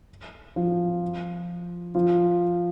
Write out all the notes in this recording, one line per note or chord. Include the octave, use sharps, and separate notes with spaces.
F3 F4
F3 F4